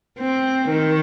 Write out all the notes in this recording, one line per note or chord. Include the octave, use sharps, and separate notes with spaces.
C4
D#3